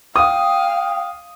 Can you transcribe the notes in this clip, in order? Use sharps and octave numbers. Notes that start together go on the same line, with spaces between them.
F5 G5 D#6